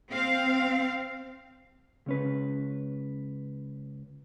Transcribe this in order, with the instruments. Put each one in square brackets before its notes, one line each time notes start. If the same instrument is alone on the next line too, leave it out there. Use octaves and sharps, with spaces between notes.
[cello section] C4 F5
[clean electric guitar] C#2 C#4 B4